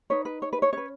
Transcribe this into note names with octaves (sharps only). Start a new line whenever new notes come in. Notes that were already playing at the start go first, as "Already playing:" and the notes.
D#4 B4 C#5
B4
C#5
B4
C#5
C#4 B4 C#5